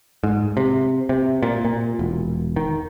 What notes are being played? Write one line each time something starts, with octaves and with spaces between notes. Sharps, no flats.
G#2
C3
C3
A#2
A#2
E1
D#3